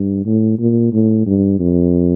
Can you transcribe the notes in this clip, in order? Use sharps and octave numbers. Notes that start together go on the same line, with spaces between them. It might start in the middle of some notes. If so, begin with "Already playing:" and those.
Already playing: G2
A2
A#2
A2
G2
F2